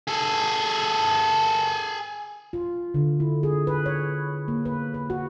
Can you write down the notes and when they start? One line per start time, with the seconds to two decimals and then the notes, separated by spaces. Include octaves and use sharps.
0.08 G#4 A4
2.53 F4
2.94 D3
3.20 E4
3.43 G#4
3.67 B4
3.86 C#5
4.48 A#3
4.65 B4
4.94 B4
5.10 F#4